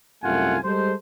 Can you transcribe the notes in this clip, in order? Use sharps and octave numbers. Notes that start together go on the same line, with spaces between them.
C2 F#2 A3 F4 F#5 G#5
G3 G#3 A4 C5